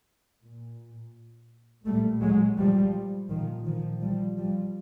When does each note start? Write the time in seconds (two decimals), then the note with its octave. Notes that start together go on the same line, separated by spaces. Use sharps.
0.43 A#2
1.86 A#2 G3 A3
2.22 F#3 G#3
2.58 F3 G3
3.30 A#2 D#3 F3
3.66 D#3 F3
4.02 F3 G3
4.38 F3 G3